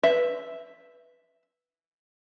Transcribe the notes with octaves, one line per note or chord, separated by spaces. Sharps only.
B4 E5